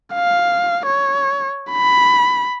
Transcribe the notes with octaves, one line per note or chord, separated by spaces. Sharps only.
F5
C#5
B5